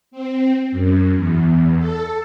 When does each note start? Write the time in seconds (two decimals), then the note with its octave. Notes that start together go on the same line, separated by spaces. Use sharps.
0.11 C4
0.72 F#2
1.15 E2
1.79 A4